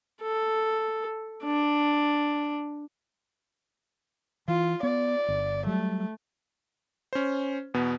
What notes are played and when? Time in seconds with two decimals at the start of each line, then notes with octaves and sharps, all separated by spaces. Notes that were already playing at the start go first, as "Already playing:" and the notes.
0.23 A4
1.44 D4
4.48 E3 F4
4.83 B3 D5
5.28 G1
5.66 F#3 G3 A3
7.13 C#4 C5
7.74 E2 B2 B3